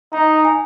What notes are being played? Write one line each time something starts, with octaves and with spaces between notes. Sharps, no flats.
D#4 A#5
G#5